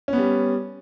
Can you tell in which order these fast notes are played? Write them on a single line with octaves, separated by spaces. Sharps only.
C#4 B3 G3